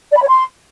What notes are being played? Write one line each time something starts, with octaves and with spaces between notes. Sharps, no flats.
D5
B5
C#5
C6